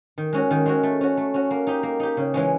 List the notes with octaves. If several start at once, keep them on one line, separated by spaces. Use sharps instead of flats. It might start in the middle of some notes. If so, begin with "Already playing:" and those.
D#3
G#3 C#4 F#4
D#3
G#3 C#4 F#4
A3
C#4 F#4
A3
C#4 F#4
A#3
D#4 G4
A#3
D#4 G4
C#3
E3 G#3 C#4